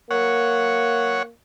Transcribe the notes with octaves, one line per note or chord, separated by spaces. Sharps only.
A#3 C#5 F#5